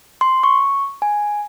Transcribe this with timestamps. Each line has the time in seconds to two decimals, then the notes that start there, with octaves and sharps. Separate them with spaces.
0.21 C6
0.43 C#6
1.02 G#5